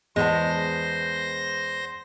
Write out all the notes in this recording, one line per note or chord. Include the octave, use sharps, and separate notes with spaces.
E2 G#3 B3 C5 A5 A#6